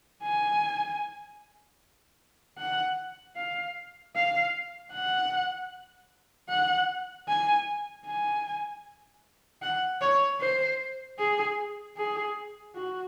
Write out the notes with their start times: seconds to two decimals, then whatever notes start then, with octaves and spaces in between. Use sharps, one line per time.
0.23 G#5
2.58 F#5
3.37 F5
4.15 F5
4.93 F#5
6.49 F#5
7.29 G#5
8.06 G#5
9.62 F#5
10.01 C#5
10.41 C5
11.19 G#4
11.97 G#4
12.75 F#4